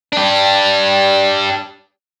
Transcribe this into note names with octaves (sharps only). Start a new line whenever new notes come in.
D4 G4